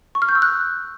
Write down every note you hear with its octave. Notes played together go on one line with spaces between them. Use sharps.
C#6
F6
G6
E6
F#6